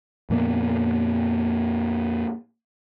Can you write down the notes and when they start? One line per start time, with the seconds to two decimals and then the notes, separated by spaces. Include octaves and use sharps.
0.30 F2 A#2 A#3 B3